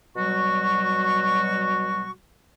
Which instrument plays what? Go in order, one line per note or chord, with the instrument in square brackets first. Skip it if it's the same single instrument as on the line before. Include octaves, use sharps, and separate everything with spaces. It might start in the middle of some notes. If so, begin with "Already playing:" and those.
[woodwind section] B2 F#3 G3 F#4 C#6